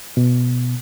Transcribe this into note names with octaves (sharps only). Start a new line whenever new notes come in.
B2